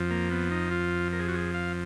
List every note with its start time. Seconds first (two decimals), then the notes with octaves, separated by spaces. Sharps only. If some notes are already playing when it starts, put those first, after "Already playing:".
Already playing: F2 F3
0.11 A#3
0.31 B3
0.51 D#4
0.71 F4
1.13 A#4
1.20 G#4
1.28 F#4
1.34 G#4
1.54 F5